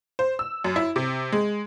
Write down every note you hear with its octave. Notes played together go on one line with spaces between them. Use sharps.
C5
E6
F#2
E4
C3
G#3